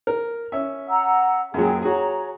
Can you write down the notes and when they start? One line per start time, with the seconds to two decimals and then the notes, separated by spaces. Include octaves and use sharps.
0.07 A#4
0.52 C#4 E5
0.88 F#5 A#5 E6
1.54 F#2 A#2 F#3 G#4 G5
1.82 F#4 G#4 C#5 A#5